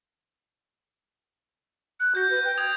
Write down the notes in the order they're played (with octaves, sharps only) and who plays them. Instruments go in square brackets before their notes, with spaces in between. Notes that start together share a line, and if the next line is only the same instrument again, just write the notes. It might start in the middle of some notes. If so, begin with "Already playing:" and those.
[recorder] F#6
[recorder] F#4 [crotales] G6 A#6
[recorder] B4
G5
[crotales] D#6 G#6 F7